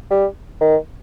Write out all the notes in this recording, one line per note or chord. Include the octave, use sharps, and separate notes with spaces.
G3
D#3